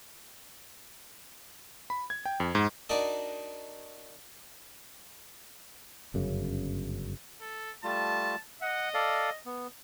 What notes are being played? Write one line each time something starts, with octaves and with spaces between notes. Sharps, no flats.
B5
G#6
G5
F2
G#2
D4 D#4 F#4 A#4 D5 D#5
G1 F#2 C#3
A4
G3 A3 F4 A5
D#5 F#5
A4 D5 F5
B3